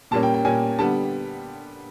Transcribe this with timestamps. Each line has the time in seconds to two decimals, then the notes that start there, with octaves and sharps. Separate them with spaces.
0.11 A#2 G3 A#3 C#4 A5
0.23 G5
0.34 G5
0.45 A#2 G3 A#3 C#4 G#5
0.79 D3 G3 B3 A5